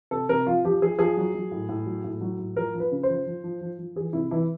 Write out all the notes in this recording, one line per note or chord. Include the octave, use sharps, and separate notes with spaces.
C3 A4
C3 A#4
F3 F4
F3 G4
F3 G#4
F3 G#4
F#3
F#3
A2
A2
F#3
A2
F#3
A2
F3 A#4
F3
B4
C#3
C5
F3
F3
F3
F3
F3
E3 G#4
C3 E4
E3 E4